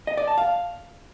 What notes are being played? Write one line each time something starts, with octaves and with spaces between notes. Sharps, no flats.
D#5
D5
A5
F5